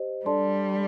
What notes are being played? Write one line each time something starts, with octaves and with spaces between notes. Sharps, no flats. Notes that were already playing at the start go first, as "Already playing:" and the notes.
Already playing: G4 C5 D#5
G3 D4 A4 D5 A5 C6